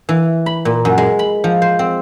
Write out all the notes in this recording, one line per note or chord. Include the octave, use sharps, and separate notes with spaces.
E3
B5
A#2
F#2
G#3
B5
F3
C5
C4